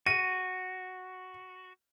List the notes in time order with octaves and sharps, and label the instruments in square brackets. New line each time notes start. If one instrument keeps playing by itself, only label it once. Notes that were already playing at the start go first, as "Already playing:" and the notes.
[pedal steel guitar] F#4 [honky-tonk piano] D#7